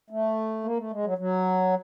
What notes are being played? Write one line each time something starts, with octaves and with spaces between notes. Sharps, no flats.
A3
A#3
A3
G#3
F#3
F#3